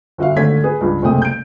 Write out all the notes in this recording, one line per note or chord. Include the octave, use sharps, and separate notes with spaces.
G1 F#4 E5 F5
G#1 D3 A3 C#5 G#6 B6
G#4 B4
C#2 G2
F#1 C3 G#3 A3 G5 D#6
G6 D7